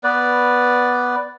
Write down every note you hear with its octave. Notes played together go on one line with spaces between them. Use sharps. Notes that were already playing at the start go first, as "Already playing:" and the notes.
B3 B4 D5